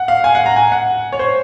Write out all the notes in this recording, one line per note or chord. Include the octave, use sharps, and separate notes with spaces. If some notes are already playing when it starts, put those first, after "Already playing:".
Already playing: F#5
F5
G#5
F#5
A#5
G#5
F#5
C#5
C5